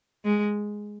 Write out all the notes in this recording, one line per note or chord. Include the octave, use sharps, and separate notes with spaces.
G#3